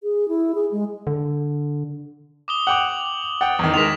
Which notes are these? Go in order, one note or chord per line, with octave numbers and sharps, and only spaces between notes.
G#4
E4
G#4
G#3
D3
D6 D#6 G7
F#5 G5 D6 F#7
F#5 G5 A6
E2 D#3
D#3 G#3 A#4 B6 E7 F7